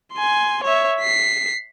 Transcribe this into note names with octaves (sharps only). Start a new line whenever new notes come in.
G#5 C6
C#5 E5
B6 C7